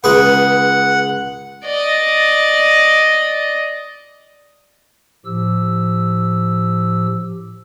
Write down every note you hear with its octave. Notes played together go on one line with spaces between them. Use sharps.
C#2 G#4 B4 F#5
D5 D#5
A2 F3 G4 E6